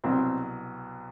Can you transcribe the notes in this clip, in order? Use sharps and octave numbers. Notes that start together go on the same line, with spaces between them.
C2 B2 F#3 C4